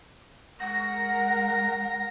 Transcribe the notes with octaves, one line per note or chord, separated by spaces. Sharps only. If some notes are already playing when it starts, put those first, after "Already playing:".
G#3 A#4 F#5 A#6